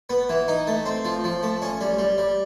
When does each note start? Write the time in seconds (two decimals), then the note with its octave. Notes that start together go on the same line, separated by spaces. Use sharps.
0.10 B3
0.29 E3
0.48 D#4
0.67 A3
0.86 C4
1.05 F3
1.24 F3
1.43 A3
1.62 C#4
1.81 G3
1.98 G3
2.18 G3